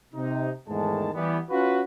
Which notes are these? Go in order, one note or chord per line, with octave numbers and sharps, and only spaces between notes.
C3 D#4
E2 G#2 D#3 G#3 A3 A5
E3 G3 B3
C#4 F4 F#4 B4